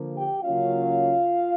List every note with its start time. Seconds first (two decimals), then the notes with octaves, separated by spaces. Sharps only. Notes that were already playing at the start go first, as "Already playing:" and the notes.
Already playing: D3 F3 A#3
0.14 G4 G5
0.44 C#3 F#3 A#3 C#4 F4 F5